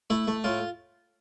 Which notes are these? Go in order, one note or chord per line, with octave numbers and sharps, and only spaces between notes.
A3 E4
A3
A2 F4